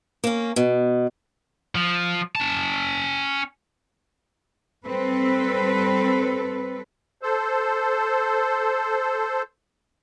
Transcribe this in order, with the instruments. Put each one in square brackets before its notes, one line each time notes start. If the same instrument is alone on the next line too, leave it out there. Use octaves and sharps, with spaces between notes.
[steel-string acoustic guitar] A#3 C#4
B2
[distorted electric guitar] F3
C#4 A5
[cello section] G3 C4 A4 B4
[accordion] A4 C5